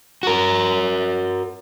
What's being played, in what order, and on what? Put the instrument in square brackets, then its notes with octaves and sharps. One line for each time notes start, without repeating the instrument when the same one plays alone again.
[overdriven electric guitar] F#4 A#4